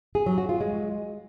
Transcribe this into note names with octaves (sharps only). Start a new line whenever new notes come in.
G#4
F#3
F#4
F4
G#3